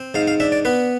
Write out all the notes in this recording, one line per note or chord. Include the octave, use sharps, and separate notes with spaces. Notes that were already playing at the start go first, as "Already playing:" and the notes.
Already playing: C4
G#2 F5
F5
D4 E5
D5
B3 B4